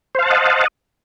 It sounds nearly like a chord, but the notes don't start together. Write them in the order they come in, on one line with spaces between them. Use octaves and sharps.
C5 F5 A5 F#5 D#5